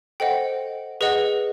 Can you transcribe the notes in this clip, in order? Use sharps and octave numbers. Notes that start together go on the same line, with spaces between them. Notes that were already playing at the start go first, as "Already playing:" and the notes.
A4 C5 D#5 F#5 G5
G#4 B4 D#5 F#5